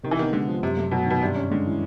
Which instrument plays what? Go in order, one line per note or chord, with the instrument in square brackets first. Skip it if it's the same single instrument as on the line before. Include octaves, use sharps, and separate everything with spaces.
[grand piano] C3 [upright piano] D#3
[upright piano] E3
[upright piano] D#3 [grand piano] B3
[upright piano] D3 [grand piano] G#3
[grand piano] F3
[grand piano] F#2 [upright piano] C3
[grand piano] A3
[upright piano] B2 [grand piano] F#3
[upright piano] B2 [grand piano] D#3
[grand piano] G2 [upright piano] C3
[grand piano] C#4
[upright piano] D3 [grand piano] G#3
[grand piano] E3